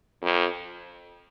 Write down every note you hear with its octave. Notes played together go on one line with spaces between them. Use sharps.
F2